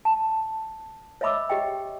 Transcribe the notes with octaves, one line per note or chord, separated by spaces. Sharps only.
A5
C#5 D#5 E5 B5 D6 E6
G4 D#5 G5